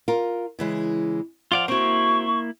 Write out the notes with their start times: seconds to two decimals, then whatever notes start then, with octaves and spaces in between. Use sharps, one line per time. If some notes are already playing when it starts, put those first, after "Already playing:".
0.08 F4 A#4
0.59 C#3 E3 G#3
1.52 F3 F4 D5 F5 F#5
1.68 A#3 C4 E4 F#4 C#6